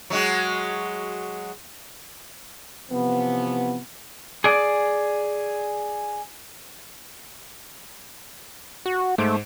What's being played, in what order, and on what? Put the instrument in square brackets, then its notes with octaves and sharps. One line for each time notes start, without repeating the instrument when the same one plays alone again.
[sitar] F#3 G#3 F#4
[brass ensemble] C3 E3 F3 B3
[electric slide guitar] G#4 D5
[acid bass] F#4
[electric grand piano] G#2 C5 D7 [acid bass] A3